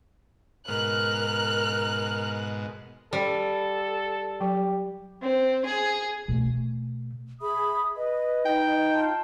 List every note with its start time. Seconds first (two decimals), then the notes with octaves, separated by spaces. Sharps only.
0.68 G#2 B2 A#4 F6 F#6
3.13 G3 A4
4.41 F#3 G4
5.22 C4
5.65 G#4
6.28 B2 A3
7.40 G#4 E5 B5 D#6
7.96 B4 D#5
8.46 D#4 G5
8.93 F4 A5